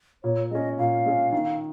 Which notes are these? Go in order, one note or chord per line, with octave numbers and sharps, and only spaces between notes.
A#2 C#5
G#3 C#4 D#5
A#2 F5
G#3 C#4
D#3